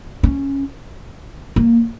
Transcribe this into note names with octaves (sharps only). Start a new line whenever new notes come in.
C#4
A#3